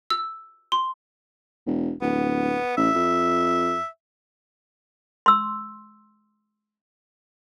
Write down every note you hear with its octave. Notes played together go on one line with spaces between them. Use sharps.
E6
C6
E1
D1 B3
A1 E5
F2
C6 E6